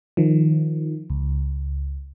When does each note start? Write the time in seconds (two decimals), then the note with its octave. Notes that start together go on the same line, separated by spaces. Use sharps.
0.17 D#3 F3
1.10 C#2